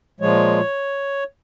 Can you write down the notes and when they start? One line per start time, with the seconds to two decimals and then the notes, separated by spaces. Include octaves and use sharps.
0.20 A#2 F3 G#3 C#5